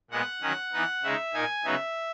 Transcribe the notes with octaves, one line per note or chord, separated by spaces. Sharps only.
A#2 G#3 B3 F#5
D#3 F#3 C#4
E3 B3 D#4
C#3 G#3 D#4 E5
A#2 A#3 D#4 G#5
C#3 F#3 B3 D#4 E5